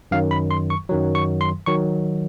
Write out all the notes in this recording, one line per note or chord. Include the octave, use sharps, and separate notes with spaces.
F#2 D#3 F#3 F5
B5
C6
C#6
F#2 D#3 F#3
C#6
C6
D#3 F#3 C#6